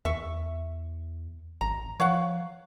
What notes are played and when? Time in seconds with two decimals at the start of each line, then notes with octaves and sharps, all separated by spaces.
0.05 E2 E5 C#6
1.61 A1 A#5
2.00 F3 C#5 F5 F#5